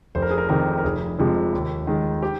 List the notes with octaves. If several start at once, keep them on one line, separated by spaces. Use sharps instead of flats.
F1 C5
A#4
G#4
A#4
F2 C3 D#3 A#4
A#4
F1 G#4
F2 C3 F3 G#3
D#2
D#3 G#3
G4